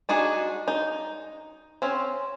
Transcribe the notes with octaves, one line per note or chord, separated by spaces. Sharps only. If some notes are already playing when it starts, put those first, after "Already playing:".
D4 D#4 F#4 G#4
D#4
C4 C#4